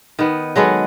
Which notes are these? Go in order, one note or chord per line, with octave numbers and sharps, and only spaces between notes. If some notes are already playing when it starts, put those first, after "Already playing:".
D#3 B3
F#3 G#3 B3 A4